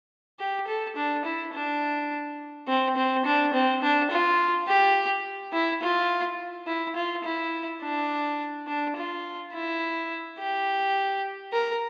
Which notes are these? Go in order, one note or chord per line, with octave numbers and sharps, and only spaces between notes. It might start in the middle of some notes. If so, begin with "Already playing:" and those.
G4
A4
D4
E4
D4
C4
C4
D4
C4
D4
F4
G4
E4
F4
E4
F4
E4
D4
D4
F4
E4
G4
A#4